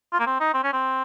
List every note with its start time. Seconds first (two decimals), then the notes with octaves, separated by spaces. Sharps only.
0.13 F4
0.20 A#3
0.27 C4
0.40 D#4
0.54 C4
0.64 C#4
0.73 C4